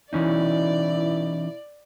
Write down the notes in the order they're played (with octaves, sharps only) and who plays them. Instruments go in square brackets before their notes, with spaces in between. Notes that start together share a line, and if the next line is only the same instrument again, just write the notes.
[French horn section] B2 E4 [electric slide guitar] E3 C#4 D#4 [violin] D5